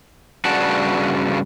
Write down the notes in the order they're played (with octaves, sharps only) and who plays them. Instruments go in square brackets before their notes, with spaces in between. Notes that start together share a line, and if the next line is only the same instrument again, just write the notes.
[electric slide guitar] G2 C#3 F#4 D5 F#5 A5